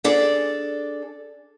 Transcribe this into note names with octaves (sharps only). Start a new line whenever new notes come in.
D4 G#4 A4 D5